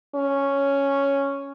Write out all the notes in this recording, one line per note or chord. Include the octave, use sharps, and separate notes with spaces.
C#4